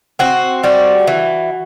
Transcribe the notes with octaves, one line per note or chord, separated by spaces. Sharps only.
C4 F#4
G3 F#4
E3